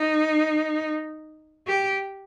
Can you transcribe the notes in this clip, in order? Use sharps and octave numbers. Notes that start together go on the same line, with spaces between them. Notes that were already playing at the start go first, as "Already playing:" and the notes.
Already playing: D#4
G4